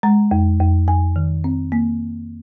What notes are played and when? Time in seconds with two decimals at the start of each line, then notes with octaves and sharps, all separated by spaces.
0.03 G#3 A#5
0.31 F2
0.60 F2
0.87 F2 G#5
1.16 D#3
1.44 C4
1.72 A#3